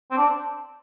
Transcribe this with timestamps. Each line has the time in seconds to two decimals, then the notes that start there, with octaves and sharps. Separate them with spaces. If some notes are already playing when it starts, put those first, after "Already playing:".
0.11 C4
0.17 D4